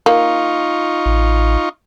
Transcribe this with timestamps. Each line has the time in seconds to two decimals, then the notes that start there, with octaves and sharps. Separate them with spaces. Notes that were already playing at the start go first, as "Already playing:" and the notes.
0.06 A#3 D#4 F4 C#6
1.06 A1